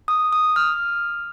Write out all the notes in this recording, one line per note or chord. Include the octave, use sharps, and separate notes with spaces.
D#6
D#6
F6